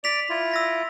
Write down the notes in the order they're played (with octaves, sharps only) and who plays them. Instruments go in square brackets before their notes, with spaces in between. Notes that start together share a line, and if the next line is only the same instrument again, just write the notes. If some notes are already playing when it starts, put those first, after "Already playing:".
[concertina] D5 [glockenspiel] B6 F7
[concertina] E4 F4
[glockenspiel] E6 A#6 B6